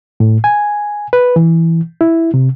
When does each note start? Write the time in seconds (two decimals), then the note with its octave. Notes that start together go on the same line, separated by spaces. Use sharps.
0.20 A2
0.44 G#5
1.13 B4
1.36 E3
2.01 E4
2.34 C3